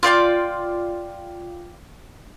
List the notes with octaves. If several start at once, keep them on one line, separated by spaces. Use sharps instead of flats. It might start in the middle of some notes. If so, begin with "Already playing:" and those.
F4 D5 G5 D6